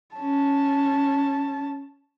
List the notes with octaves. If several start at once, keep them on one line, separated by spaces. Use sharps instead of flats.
C#4 A5